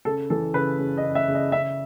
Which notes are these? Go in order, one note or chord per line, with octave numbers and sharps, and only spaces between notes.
C#3 A4
E3 A4
C#3 B4
C#3
D#5
C#3
E5
C#3
D#5
C#3 E5